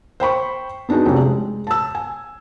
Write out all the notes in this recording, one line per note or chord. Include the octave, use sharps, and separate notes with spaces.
C5 G5 B5 C#6
B3 D4 D#4 F#4 G#4
F1 F2 C4 C#4
G#3
A5 E6
G#5